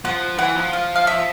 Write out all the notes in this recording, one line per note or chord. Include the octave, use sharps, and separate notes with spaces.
F3 F#5
E3 F#5
F3
F5
F5
E5